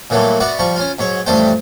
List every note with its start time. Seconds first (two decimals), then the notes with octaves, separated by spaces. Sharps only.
0.10 A#2 E3 F#3 G3 A3
0.40 B3 F#4 D5 E5 F#5
0.59 F3 G3 C#6
0.76 C#4 F4
0.99 G#2 F#3 C#5
1.26 A1 F2 G3 A3 C5 G5